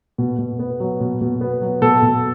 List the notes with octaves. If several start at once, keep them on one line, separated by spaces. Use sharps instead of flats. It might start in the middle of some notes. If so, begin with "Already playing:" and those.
B2
B2
B3
F#3
B2
B2
B3
F#3
B2 A4
B2